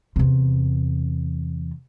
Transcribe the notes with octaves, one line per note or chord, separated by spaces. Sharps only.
E2 C3